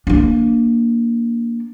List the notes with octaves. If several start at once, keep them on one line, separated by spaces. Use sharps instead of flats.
A#3 D4